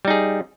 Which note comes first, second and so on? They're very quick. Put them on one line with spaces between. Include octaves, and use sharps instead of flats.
G3 D#4 G#4